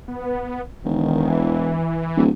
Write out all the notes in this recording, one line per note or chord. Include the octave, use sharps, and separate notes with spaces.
B3
E1 D#3
E3
D1